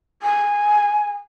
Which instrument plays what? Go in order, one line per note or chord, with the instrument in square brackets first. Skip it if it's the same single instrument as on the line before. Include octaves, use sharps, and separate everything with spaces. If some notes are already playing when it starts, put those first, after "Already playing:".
[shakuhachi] G#5